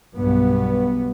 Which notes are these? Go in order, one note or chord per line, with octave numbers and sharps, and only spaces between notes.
B1 G2 B3